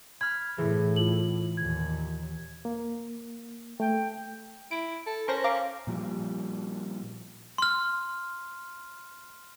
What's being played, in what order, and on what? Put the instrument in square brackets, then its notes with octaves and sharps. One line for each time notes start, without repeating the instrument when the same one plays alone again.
[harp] B5 F6 [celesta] G#6
[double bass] A2 [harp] E3 [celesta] G#4
[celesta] F4 F#7
[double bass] D#2 A#2 [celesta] G#6
[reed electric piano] A#3
[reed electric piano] A3 [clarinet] G5
[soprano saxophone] E4 [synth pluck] D7
[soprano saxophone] A4
[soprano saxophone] C#4 [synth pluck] A#4 C5 A#6
[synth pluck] F5 A#5 D6
[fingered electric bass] A#2 F3 G3
[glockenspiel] C6 F6